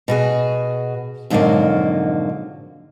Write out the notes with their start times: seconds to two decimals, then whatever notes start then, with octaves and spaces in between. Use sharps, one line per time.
0.08 B2 F#4 G#4
1.30 F2 G#2 B2 D3 F#3 A#3